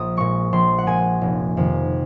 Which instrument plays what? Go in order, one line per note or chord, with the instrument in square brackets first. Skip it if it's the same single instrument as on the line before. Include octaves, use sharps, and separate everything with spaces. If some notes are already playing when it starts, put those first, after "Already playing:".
Already playing: [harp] A#1 D#6
A#2 G#3 C#6
A#1 C6
F#5
A#2 G#3 G#5
F1
F2 C3 D#3